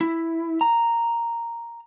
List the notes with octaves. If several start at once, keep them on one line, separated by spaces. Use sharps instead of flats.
E4
A#5